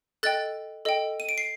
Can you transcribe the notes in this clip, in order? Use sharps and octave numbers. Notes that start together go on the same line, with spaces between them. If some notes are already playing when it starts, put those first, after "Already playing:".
A4 D#5 G5 F#6 A6
A4 D#5 G5
D#7
D7
C7